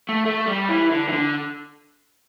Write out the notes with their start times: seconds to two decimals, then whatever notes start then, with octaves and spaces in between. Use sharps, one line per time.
0.09 A3
0.26 A3
0.47 G3
0.69 E3
0.91 D3
1.09 E3
1.13 D3